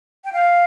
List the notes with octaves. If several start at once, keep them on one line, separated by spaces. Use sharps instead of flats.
G5
F5